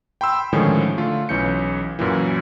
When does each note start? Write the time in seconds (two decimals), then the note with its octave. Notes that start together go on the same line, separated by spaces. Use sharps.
0.21 G5 B5 C6 E6
0.53 A2 D3 D#3 F3 G#3 C#4
0.98 D3 A3 F4
1.29 B1 E3 C#4 G6 C#7
1.99 F#2 A#2 E3